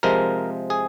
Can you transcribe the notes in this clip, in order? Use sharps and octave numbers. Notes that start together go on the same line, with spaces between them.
C3 F3 G#3 A#4
G#4